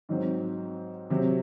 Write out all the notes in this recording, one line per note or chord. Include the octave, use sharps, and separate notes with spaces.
G#2 F#3 C4
C3 F#3 C4